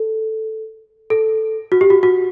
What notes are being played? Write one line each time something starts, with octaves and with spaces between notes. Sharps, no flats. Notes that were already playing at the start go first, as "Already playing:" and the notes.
Already playing: A4
A4
F#4
G4
F#4
F#4